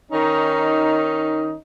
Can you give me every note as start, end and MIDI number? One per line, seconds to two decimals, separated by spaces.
0.11 1.54 51
0.11 1.54 61
0.11 1.54 63